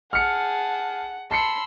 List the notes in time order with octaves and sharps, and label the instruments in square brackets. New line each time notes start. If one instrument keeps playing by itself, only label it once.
[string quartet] G#4 A5 [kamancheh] F#5 [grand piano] F6 C#7
[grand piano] A5 C7 C#7 [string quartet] B5 C6 E6